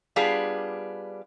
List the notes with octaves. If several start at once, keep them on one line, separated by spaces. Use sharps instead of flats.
G3 B3 D4 F4 G#4